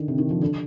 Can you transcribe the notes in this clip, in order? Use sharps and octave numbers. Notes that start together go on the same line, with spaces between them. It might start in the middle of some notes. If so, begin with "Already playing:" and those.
Already playing: D3 D#3
C3
D#3
F3
D3